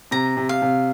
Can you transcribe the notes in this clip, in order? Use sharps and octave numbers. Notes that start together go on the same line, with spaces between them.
C3 A#5
C3
F5
C3